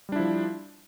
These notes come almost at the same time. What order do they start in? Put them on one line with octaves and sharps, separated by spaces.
G3 D4 E4 F3